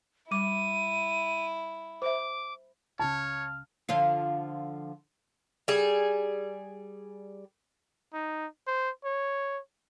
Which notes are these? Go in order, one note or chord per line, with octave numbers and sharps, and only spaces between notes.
G3 E4 D6 D#7
C5 E5 D6
C#2 C#3 C#5 F5 A5
D3 F3 F4
G3 G#4
D#4
C5
C#5